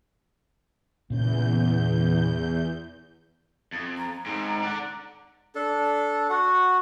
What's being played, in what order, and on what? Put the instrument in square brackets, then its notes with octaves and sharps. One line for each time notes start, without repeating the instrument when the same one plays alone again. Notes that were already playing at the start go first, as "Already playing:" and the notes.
[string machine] E2 G6 [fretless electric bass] A#2 C#3
[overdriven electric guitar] F2
[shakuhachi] A#5
[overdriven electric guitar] G#2 C4
D5 F#5
[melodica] D4 A4
F#4 F#5